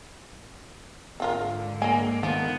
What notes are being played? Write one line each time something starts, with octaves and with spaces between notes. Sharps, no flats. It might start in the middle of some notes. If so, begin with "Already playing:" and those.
G#2 D3 C4 F4 A#4
A#3 D#5 G#5
D#3 F3 B3